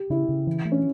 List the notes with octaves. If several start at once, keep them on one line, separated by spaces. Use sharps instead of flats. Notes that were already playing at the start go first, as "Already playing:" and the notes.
Already playing: G4
C#3 E4
C#3
E3
A3
C#4